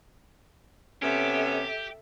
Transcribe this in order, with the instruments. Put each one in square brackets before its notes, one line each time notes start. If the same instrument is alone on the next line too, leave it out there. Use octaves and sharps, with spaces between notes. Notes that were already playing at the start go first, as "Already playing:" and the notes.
[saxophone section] C3 B3 C#4 [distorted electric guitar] G4 [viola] A4 E5